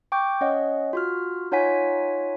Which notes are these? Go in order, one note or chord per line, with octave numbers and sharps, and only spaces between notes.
G5 C#6 D6 G6
C#4 C#5 D#5 F#5
F4 F#4 F6
D#4 F4 C#5 F#5 G#5 B6